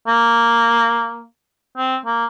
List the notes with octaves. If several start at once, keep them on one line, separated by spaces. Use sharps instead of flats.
A#3
C4
A#3